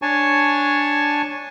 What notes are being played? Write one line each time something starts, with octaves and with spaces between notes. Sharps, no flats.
D4 C#5 G#5 A5 C#6